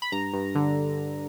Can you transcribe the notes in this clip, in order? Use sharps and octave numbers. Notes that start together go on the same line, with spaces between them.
B5
G2 A#5
G2
D3